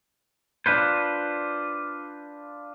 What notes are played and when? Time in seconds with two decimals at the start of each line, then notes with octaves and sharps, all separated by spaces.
0.66 D4 F4 B4 C5